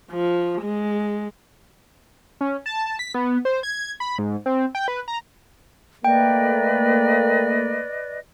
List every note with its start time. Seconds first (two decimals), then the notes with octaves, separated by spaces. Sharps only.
0.11 F3
0.61 G#3
2.41 C#4
2.66 A5
2.99 B6
3.14 B3
3.45 C5
3.63 G#6
4.00 B5
4.18 G#2
4.46 C4
4.75 G5
4.88 B4
5.08 A#5
6.05 A3 A#3 B4 D5 D#5 G5